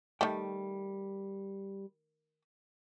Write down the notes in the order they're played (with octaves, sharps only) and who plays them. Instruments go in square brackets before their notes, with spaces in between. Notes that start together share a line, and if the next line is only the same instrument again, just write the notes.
[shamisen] D#3 A3 [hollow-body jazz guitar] G3 G5